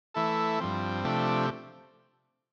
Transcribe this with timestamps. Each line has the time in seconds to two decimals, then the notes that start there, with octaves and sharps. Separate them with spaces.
0.14 E3 A3 E4 A4
0.60 G2 F3 C4
1.04 C3 F3 A3 D4 G4